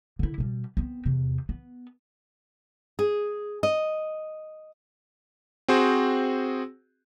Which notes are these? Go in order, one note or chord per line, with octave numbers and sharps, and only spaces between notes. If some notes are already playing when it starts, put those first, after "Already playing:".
D3 E4
B2 G3
B3 C4
E2 C3
B3
G#4
D#5
C4 F#4 G#4 C5